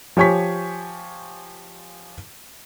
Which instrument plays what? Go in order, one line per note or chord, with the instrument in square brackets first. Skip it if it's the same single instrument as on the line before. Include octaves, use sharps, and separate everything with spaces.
[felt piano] F3 G4 C#5 G#5 C#6 B6